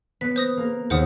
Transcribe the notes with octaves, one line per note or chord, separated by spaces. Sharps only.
B3 B6
C5 D#6 A#6
A#3 A#4
D#2 D#3 C5 F#5 D#6